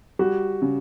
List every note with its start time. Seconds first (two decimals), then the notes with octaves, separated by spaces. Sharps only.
0.19 G3 F#4
0.62 C#3